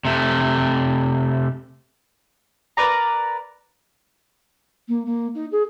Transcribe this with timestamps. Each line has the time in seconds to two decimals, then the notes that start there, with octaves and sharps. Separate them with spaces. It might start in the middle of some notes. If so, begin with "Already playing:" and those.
0.05 C3 A3
2.77 A#4 B4 D5 A#5
4.88 A#3
5.06 A#3
5.34 D#4
5.52 G#4